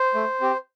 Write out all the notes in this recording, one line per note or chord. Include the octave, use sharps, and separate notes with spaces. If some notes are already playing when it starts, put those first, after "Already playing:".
Already playing: C5
A3
C4 G4